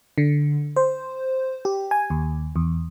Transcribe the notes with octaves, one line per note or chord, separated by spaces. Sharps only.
D3
C5
G4
G#5
D#2
E2